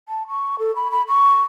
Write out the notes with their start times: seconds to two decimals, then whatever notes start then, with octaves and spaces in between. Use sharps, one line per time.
0.09 A5
0.28 C#6
0.59 A4
0.76 B5
0.91 B5
1.08 C#6